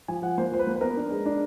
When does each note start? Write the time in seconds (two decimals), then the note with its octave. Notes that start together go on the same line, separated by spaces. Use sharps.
0.08 F3 G#5
0.22 F3 F#5
0.38 A#3 C5
0.52 F3 C5
0.59 B4
0.67 A#3
0.75 B4
0.81 B3 A#4
0.97 D4
1.11 G#3
1.26 D4